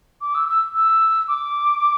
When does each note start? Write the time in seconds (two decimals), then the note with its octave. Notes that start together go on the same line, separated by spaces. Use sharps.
0.21 D6
0.34 E6
0.48 E6
0.75 E6
1.28 D6